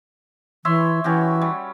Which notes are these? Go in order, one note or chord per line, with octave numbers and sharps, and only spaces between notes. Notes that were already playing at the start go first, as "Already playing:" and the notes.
E3 C#5 E5 C6
E3 C#4 F#4 G4
G3